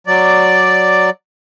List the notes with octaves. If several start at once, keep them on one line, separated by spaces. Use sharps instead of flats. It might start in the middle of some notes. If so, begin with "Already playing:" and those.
F#3 D5